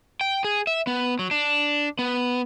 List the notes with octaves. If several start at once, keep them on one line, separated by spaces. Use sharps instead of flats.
G5
G#4
E5
B3
F#3
D4
B3